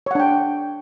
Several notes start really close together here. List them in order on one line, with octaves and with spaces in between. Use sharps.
C#5 F#5 D4 G5